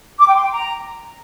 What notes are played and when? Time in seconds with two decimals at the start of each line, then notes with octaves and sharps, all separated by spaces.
0.19 D6
0.27 G5
0.35 C6
0.44 G5
0.52 A#5